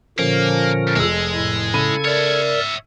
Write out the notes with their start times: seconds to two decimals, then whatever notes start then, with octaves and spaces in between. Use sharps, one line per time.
0.19 A#2 D3 F3 A#3 C#4 A#4
0.96 F1 G#3 G#4 E6
1.35 A2 B5
1.73 C#3 A4 B5 G#6 D#7
2.05 A#4 C#5 D5 E5